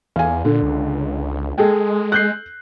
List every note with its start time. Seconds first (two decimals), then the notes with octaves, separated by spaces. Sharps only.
0.16 E2 F5 G#5
0.45 A#2 D3
0.62 C#2
1.58 G#3 G#4 A4 G5
2.12 F#6 G6 C7